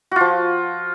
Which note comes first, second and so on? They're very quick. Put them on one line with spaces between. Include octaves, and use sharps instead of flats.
F#4 F4 F3